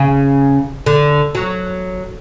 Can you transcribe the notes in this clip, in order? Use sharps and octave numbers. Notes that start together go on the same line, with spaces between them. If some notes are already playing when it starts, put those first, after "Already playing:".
Already playing: C#3
D3
F#3